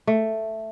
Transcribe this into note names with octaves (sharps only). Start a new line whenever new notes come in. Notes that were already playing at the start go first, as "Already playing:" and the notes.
A3